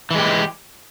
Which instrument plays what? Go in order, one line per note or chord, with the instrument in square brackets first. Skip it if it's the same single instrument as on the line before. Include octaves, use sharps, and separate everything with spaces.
[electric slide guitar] E3
G#3
G4